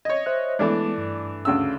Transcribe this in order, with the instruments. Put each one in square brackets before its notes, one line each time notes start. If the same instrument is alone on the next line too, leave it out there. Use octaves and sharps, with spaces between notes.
[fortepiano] C#5 D#5 [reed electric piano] G#6
[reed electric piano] C5 E5 F#6
[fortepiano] E3 A3 D4 [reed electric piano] G#3 B3
[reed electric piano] G2
[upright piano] D2 C#3 E6